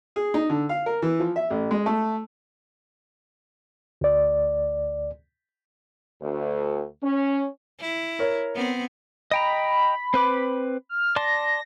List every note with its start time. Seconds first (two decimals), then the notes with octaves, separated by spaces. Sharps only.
0.16 G#4
0.34 D#4
0.50 D3
0.69 F5
0.86 A#4
1.02 E3
1.20 F3
1.36 E5
1.50 A1
1.71 G#3
1.86 A3
4.01 D2 D5
6.22 D2
7.03 C#4
7.80 E4
8.19 A#4 C#5
8.55 B3 C4
9.31 D#5 G5 A#5 B5
10.14 C4 B4 D6
10.89 F6
11.16 D5 A5 C6 A#6